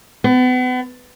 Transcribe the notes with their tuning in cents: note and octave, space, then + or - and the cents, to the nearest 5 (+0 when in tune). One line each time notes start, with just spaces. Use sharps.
B3 +35